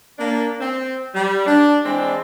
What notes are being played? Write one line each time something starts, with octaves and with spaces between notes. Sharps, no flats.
A#3 D4
C4
G3
D4
E3 G#3 C4 D4